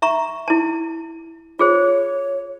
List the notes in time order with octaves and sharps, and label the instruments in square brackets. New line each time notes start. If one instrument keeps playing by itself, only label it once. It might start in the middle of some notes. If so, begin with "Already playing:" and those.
[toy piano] E5 A#5 C#6
E4 A5
[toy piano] F4 G#4 C5 [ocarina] C#5